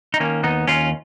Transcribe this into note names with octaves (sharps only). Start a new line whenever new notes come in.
D#4
D#3 A#3 C#4
D#2 B3 D#4
D#2 C#4 F4